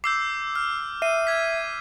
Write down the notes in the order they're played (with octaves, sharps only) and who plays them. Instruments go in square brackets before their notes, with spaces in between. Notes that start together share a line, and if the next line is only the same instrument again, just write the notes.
[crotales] D6 E6 G6 [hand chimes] C7
[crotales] F6
[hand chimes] E5 [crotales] C7 D#7
[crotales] G#6 B6